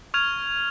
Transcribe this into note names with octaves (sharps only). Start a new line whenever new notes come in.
C#6 F6 G#6 F7